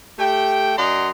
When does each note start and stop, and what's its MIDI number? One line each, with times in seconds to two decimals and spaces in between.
0.19 0.74 57
0.19 0.74 67
0.19 0.74 79
0.78 1.10 42
0.78 1.10 74
0.78 1.10 75
0.78 1.10 78
0.78 1.10 82
0.78 1.10 84